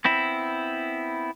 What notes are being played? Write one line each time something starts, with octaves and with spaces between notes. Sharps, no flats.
B3 C4 E4